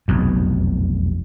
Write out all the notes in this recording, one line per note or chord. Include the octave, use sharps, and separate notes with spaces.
F1 B1 E2